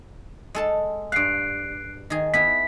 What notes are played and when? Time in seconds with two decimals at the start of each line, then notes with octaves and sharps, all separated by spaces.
0.55 G#3 A4 A5
1.12 G2 F5 F#6 C7 D7
2.10 D#3 G#4
2.34 B3 E4 B6